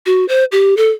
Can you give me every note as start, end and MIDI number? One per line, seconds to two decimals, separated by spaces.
0.06 0.27 66
0.29 0.44 72
0.52 0.77 67
0.77 0.91 69